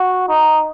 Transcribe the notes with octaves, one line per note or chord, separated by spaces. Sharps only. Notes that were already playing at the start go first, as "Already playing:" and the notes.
Already playing: F#4
D#4